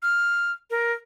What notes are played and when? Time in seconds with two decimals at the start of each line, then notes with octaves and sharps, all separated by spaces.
0.03 F6
0.70 A#4